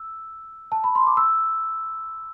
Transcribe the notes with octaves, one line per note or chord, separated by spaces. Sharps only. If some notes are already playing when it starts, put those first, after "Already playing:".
Already playing: E6
A5
B5
C6
D6
E6